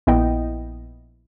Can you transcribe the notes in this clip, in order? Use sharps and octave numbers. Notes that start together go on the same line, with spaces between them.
A#1 B3 E4 D#5 G5